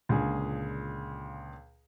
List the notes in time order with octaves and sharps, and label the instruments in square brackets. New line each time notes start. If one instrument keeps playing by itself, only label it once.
[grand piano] C#2 A#2 D3 G#4